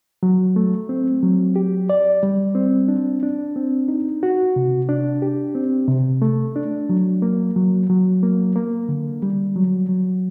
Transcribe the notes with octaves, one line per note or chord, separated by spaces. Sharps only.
F#3
A3
C4
F#3
G4
D5
G3
C4
D4
D4
C4
D#4
F#4
C3
D4
G4
C4
C3
A3
D4
F#3
A#3
F#3
F#3
A#3
A#3
D3
G3
F#3
F#3